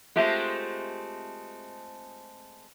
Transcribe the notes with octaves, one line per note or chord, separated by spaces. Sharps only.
G#3 A3 C4 F4 G4 E5